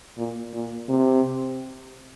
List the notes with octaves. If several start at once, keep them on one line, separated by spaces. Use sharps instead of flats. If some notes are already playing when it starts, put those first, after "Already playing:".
A#2
A#2
C3